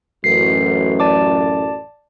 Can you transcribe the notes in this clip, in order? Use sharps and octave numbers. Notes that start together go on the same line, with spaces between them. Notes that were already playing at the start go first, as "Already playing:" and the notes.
A1 F#2 C7
D5 A5 D6